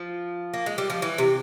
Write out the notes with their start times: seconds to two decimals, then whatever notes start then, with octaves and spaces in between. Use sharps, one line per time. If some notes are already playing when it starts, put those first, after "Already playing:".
Already playing: F3
0.54 A#3
0.66 G#3
0.78 G3
0.90 F3
1.02 E3
1.18 C3